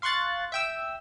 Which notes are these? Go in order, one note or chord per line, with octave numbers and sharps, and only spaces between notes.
F5 C6 C#6 F#6 A6
E5 G5 E6